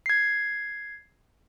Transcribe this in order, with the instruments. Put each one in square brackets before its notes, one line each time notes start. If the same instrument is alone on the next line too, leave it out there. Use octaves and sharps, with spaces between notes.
[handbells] G#6 C7